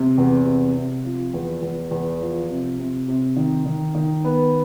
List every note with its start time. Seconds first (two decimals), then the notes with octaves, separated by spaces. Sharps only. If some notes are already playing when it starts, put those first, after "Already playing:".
Already playing: C3
0.18 E2
0.45 C3
0.76 C3
1.04 F3
1.33 E2
1.62 E2
1.91 E2
2.21 F3
2.49 C3
2.79 C3
3.08 C3
3.36 D#3
3.66 D#3
3.95 D#3
4.24 B3